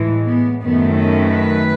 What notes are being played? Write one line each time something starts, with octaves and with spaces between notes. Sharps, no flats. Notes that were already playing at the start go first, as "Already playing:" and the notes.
Already playing: A2 E3 G#3
B3
F#2 D#3 A3 B3
C#4
B4